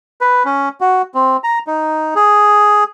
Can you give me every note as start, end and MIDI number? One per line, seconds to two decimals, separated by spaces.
0.21 0.43 71
0.45 0.69 61
0.81 1.02 66
1.14 1.37 60
1.44 1.59 82
1.67 2.14 63
2.15 2.84 68